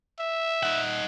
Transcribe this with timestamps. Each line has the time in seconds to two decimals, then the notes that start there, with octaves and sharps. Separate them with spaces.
0.19 E5
0.63 D#4 F#5